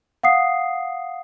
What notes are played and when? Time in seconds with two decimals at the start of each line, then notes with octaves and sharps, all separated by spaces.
0.23 F5 F#5 D#6 C7